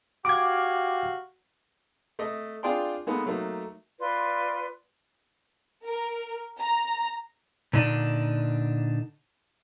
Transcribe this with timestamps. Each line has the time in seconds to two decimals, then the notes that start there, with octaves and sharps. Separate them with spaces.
0.25 F#4 G4 F5 D6 G#6
2.19 A3 D#5
2.63 D4 F4 G#4 D5 G5 C6
3.07 G#3 A#3 B3 D#4 A4
3.26 F#3 A3 A#3 D#4
3.99 F4 B4 D5 C6
5.86 A#4
6.60 A#5
7.73 A#2 D3 D4 D#4